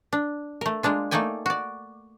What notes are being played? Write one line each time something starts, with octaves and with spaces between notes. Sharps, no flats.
D4
A3 A#4
G#3 A#3 D4 F4
A3 A#3 D#4 D5 G5 G#5
F#4 D5